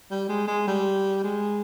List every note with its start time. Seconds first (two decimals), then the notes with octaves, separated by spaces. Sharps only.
0.11 G3
0.29 G#3
0.48 G#3
0.67 G3
1.24 G#3